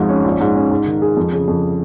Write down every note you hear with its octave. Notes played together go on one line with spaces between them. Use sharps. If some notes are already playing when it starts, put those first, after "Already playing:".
Already playing: G#1 F2 G#2
C#4
A#1
G#2
C#4
G#2
D#3
G#4
F2
C#3
F2